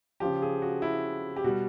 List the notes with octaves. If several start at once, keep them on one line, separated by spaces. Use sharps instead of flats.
C#3 F3 G4
G#4
F#4
E4
G4
B2 G3 F#4